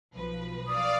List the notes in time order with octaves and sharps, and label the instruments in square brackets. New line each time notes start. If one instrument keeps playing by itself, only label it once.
[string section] B1 F3 B4
[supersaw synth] D5 F5 [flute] D#6